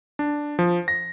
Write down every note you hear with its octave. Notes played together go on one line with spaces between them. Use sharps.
D4
F3
A#6